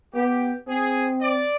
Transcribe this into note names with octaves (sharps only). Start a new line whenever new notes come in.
B3 G4
C4 G#4
D5